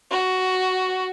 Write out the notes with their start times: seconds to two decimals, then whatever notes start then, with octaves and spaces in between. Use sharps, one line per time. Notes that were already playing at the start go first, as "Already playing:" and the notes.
0.11 F#4